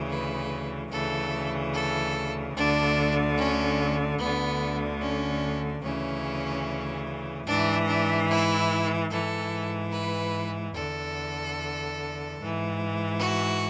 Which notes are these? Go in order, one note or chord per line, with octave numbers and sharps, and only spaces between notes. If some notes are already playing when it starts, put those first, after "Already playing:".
Already playing: D2 C#3 E3
B4
D2 C#3 E3 A4
A4
D2 D3 D4
C#4
D2 D3 B3
C#4
D2 C#3 E3 C#4
G#2 E3 D4
D4
E4
G#2 E3 A4
B4
E2 D3 A4
G#2 E3
F#4